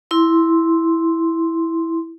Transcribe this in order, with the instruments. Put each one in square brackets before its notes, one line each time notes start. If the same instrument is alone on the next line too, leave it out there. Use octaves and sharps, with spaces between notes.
[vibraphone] E4 C6